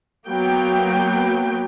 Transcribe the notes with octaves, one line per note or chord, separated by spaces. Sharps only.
F#3 A#3 B3 G5